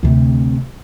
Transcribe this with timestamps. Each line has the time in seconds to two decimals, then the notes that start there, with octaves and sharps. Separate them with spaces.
0.03 D2 C3